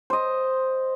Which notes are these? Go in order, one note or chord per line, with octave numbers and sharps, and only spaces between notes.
C5 D#5